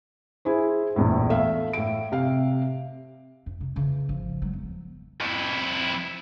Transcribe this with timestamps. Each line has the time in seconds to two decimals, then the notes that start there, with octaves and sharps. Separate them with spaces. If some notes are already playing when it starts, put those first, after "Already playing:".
0.45 E4 G#4 C5
0.96 A#1 E2 A2
1.30 A3 E5 F5
1.73 A2 D7
2.12 C3 F5
3.46 F2
3.60 C3
3.76 C#3 E3
4.09 G#1 F3
4.42 F#3 G#3
4.53 E2
5.21 F2 E4